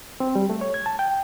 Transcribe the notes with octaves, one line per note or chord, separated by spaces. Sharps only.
C4
G3
A3
C#5
G#6
A5
G5